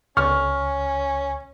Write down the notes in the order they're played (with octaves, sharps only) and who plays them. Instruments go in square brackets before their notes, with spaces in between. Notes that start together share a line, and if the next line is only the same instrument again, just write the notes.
[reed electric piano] C#2 C#6 [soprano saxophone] C#4 [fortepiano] F6